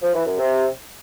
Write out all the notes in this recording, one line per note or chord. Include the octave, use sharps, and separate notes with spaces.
F3
E3
F#2
C3